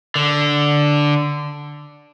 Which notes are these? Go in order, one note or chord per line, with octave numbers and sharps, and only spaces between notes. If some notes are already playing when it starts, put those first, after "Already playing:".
D3